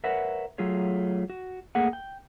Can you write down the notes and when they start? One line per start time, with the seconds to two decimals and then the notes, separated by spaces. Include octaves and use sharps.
0.04 A#4 B4 C#5 E5 F#5
0.58 F#3 A3 F4 G#4 C#5
1.30 F#4
1.75 A3 A#3 G#4 F#5
1.93 G5